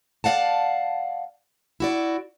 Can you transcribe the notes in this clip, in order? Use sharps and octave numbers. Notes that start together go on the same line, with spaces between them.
D5 D#5 F5 F#5 A5
E4 F#4 D5